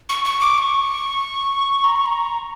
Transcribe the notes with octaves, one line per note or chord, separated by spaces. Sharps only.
C#6
C#6
D6
C#6
A#5
C#6
A#5